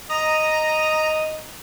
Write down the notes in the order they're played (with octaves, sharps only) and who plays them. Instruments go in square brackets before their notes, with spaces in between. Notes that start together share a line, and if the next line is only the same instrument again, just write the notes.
[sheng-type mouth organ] D#5 D#6 [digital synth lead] A#5